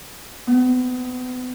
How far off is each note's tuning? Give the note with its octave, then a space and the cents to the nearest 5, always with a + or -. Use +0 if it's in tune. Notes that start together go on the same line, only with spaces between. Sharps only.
B3 +35